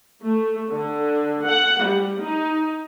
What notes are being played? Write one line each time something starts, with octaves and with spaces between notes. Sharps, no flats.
A3
D3
F#5
G3
D#4